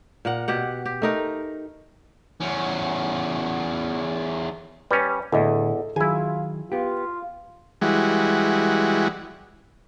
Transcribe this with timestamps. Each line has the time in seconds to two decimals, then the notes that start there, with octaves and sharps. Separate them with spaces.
0.25 A#2 A#4 F#5
0.48 B2 G4 F#5
0.86 G4
1.02 A3 D#4 A#4
2.40 E2 C#4
4.91 G3 C#4 B4
5.32 E2 A2 D3 A4 D#5
5.96 D#3 F#3 E4 F4 G#4 G#5
6.72 B3 F4 G4
7.81 E3 G3 G#3 F#4